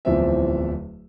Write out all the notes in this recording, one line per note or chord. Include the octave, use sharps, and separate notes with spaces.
D1 E2 F3 C4 E5